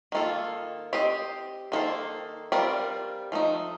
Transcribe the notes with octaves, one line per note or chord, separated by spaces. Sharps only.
D#3 A#3 F4 A4
C4 G4 C5 D#5
D#3 A#3 D#4 A4 C5
G3 C4 F4 A#4 D5
F3 A3 D#4